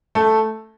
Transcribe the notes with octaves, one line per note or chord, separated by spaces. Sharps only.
A3 A4